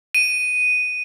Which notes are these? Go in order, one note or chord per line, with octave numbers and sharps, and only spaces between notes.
D#7